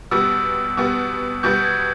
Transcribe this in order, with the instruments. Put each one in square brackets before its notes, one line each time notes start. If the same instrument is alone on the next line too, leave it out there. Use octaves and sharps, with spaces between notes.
[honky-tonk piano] B2 G3 B3 [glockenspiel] E6
[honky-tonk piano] B2 G3 B3
[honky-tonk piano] B2 G3 B3 [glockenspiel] G6
[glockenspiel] G#6